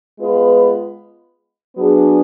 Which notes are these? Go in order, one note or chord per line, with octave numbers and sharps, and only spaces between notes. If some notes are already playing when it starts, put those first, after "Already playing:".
G#3 B3 F4 B4
F#3 B3 D4 G#4